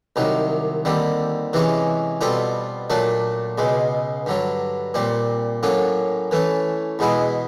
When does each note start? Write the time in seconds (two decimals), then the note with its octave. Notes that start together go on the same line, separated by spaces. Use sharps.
0.16 C2 C3 D#3 F#3
0.85 D#2 D3 G3 C4
1.53 C3 E3 G#3 C#4
2.21 B2 G3 C4 F4 A4
2.90 A#2 F#3 A3 D4
3.58 C#2 B2 G#3
4.26 G2 D3 F#3
4.94 A#2 G3 C4
5.63 A2 F#3 A#3 C#4
6.31 E3 A3 C#4
6.99 E2 B2 G#3 B3 E4